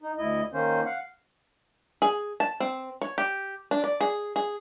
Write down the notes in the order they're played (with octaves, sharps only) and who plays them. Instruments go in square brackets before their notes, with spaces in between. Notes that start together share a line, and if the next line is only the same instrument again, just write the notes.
[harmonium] D#4
D2 E4 D#5
D#3 A#3 C#4 C5
F5 F#5
[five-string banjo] G#4
A5
C4
C#5
G4
D4
D5
G#4
G#4